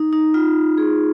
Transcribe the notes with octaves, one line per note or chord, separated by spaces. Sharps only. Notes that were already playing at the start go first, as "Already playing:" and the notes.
Already playing: D#4
D#4
F4
G#4